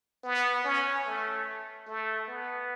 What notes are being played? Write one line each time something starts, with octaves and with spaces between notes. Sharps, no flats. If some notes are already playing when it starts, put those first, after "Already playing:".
B3
C#4
A3
A3
B3